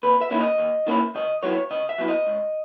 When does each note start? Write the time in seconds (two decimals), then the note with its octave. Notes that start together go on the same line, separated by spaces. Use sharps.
0.03 D#2 B4
0.21 E5
0.31 D#3 A#3 C#4 E4
0.40 D#5
0.58 D#2
0.87 D#3 A#3 C#4 E4
1.15 C#3 D#5
1.43 F#3 B3 E4 C#5
1.71 C#3 D#5
1.89 E5
1.98 F#3 B3 E4
2.08 D#5
2.27 C#2